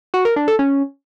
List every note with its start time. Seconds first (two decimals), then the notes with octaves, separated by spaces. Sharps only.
0.14 F#4
0.25 A#4
0.36 D4
0.48 A4
0.59 C#4